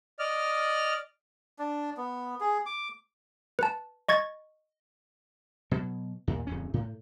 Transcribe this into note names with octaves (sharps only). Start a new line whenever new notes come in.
D5 D#5 F6
D4
B3
G#4
D6
B4 A5
D#5 C#6 G#6 A6
B2 F#3
D#2 A#2
D1 F2 C#4
A2